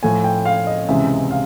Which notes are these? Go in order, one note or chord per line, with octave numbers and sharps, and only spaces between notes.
A2 F3 A3 G#5
G5
F5
D#5
C#2 C3 E3 G#3 C#4 E5
F5